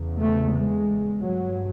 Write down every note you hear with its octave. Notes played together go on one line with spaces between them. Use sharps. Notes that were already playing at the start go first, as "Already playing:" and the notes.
Already playing: E2 C#3
A3
G#3
G2 F#3